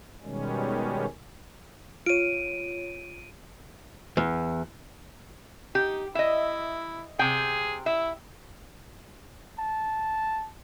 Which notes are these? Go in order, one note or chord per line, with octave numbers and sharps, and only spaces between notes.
B2 D#3 G3 G#3 C#4
F4 C#5 D7 D#7
E2
D#4 G4
E4 D#5 E5
C3 G#4 G5
E4 E5
A5